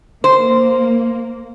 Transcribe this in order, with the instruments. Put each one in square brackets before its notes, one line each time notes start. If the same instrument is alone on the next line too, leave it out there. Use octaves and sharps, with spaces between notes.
[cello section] A#3 [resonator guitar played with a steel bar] C5